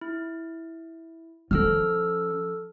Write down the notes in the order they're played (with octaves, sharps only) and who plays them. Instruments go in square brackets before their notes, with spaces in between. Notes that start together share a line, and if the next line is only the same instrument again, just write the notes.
[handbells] E4
[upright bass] F3 C#4 [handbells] A4 E6 F6